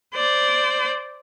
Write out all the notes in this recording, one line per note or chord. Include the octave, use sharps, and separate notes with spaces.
C5 D5